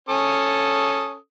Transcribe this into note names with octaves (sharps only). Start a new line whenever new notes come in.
C#4 A4 D#6